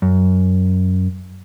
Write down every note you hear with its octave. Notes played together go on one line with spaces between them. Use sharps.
F#2